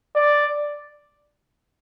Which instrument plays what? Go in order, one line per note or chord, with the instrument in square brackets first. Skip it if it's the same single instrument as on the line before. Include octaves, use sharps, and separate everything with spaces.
[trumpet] D5